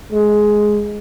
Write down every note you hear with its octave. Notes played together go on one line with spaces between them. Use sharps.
G#3